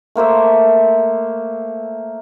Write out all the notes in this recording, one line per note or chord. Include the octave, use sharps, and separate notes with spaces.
A3 A#3 C5 E5